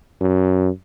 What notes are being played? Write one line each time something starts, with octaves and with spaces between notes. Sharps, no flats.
F#2